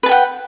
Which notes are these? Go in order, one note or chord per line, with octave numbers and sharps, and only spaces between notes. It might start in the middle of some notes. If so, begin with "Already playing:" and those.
B4 F#5 G5 A5